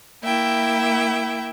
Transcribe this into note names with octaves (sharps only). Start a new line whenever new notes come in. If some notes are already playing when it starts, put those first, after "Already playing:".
A#3 E4 E5 G5